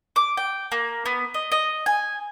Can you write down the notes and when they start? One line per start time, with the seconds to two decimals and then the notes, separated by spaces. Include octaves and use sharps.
0.16 D6
0.37 G5
0.72 A#3
1.06 B3
1.34 D#5
1.52 D#5
1.86 G#5